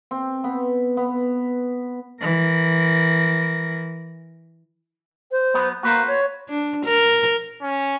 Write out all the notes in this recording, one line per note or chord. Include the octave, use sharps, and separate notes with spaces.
C4
B3
B3
E3 A#4
C5
F#3 B3
A#3 F#4 B4 C5
C#5
D4
A#4
C#4